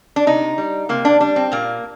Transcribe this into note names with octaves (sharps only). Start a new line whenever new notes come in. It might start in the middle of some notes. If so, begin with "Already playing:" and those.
D4
C3 D#4
G3
C3 A#3
D4
G3 D4
C4
A#2 A#3